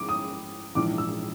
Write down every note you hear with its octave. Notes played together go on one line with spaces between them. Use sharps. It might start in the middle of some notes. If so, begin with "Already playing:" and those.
Already playing: G#2 F3 D6
D#6
A#1 G#2 E3 D6
E6